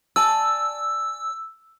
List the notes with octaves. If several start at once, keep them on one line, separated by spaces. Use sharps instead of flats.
D5 G#5 A5 E6